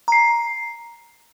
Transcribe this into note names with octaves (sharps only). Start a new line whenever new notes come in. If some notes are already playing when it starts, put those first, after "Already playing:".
A#5 C7